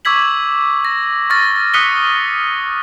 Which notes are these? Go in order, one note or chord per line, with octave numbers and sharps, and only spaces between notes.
C#6 D6 E6 G#6 B6 F#7
A#6
C#6 F6 A6 A#6
A6
D#6 F#6 B6 C#7 D#7 G7